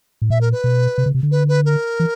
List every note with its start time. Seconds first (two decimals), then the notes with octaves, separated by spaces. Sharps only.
0.22 A2
0.30 A#2 E5
0.41 A#4
0.52 B4
0.64 B2
0.98 C3
1.06 C#3
1.14 C3
1.23 D3
1.32 B4
1.49 B4
1.65 A#4
2.00 E3